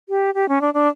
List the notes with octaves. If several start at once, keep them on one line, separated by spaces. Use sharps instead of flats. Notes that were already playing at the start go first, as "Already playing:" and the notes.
G4
G4
C#4
D4
D4